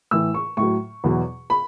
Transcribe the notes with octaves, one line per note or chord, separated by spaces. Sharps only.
A2 E3 E6
C#6
A2 C#6
F#3
E2 B2 F#3
B5